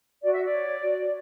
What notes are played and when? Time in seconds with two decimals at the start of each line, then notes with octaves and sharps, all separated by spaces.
0.22 F#4 D5
0.33 E5
0.43 D5
0.52 C#5
0.82 F#4